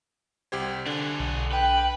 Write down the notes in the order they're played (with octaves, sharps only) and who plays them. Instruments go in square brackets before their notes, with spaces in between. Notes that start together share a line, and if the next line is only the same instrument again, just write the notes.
[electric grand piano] C2 G4 C5 [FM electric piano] G#6
[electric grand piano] D3 [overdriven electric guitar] D4 G#4
[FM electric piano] B1
[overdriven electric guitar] B4 [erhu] G5